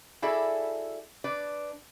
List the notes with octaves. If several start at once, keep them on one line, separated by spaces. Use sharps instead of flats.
E4 F#4 G#4 A4 D5 E5
D4 B4 D5